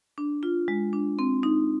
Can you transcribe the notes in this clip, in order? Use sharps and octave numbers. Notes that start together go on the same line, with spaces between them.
D4
F4
G#3
D4
C4
D#4